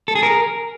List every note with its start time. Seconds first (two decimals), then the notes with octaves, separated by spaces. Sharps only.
0.08 A4
0.15 G#4
0.23 A#4